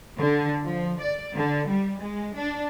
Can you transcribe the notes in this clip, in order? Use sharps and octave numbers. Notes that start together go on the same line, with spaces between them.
D3
F3
D5
D3
G3
G#3
D4